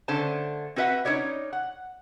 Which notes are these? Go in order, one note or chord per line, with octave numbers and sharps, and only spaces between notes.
D3 A3 C#4 C5 A5
C4 F#4 B4 E5 F#5
C#4 D#4 E4 A4 C#5 D5
F#5